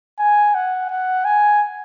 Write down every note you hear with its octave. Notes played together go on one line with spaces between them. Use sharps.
G#5
F#5
F#5
G#5